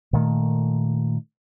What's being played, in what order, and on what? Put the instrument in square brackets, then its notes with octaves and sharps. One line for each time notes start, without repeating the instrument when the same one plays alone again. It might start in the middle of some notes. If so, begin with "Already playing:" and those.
[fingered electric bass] A#2 D#3 A3